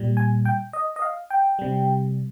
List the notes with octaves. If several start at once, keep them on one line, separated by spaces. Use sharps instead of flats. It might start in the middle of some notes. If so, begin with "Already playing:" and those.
Already playing: A#2 G3
G#5
G5
D#5
D#5
F5
G5
C3 G3